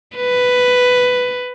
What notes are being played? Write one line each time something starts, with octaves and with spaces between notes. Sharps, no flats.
B4